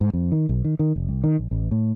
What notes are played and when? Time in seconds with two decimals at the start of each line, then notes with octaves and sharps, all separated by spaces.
0.01 G#2
0.13 F2
0.32 D#3
0.49 B1
0.65 D#3
0.79 D#3
0.96 F1
1.08 C2
1.24 D#3
1.39 A#1
1.51 A1
1.71 A2